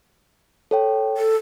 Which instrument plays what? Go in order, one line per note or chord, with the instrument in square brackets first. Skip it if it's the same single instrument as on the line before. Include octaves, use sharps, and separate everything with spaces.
[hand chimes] A4 C#5 G5
[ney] A4